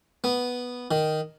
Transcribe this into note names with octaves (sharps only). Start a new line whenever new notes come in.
B3
D#3